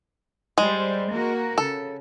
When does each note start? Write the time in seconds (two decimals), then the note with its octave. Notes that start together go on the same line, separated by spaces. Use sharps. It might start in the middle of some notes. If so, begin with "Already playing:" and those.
0.58 G3 G#3 C5
1.10 A#3 F#4 A#4
1.58 C#3 A4